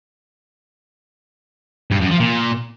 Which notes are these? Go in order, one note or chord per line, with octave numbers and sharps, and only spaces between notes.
G2
F#2
F3
A#2